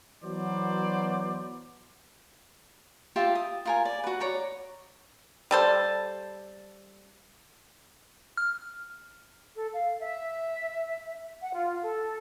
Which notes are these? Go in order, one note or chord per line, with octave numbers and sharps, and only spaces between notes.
E3 F#3 B3 C5 D5
F4 G4 E5 A5
D#6
F4 A#4 G#5
D5
F#4 B4
C#5 D5 A#5
G3 A4 C5
F6
A4
F5
E5
F#5
F4
A4